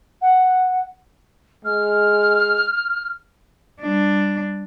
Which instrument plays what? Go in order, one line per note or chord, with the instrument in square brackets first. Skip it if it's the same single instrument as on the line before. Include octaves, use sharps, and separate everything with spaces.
[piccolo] F#5
[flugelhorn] G#3 [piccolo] F6
[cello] G3 D4